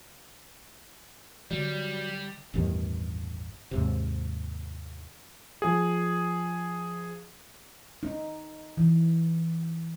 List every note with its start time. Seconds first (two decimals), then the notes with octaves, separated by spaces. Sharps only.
1.51 D3 F#3 G3 D5
2.54 A1 E2 G2 D#3
3.71 D#2 G#2 C3
5.62 F3 G#4
8.03 D#4
8.77 E3